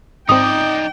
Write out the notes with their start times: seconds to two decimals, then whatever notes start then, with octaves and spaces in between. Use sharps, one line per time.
0.29 G#1 C4 D#4 D5 G5 D#6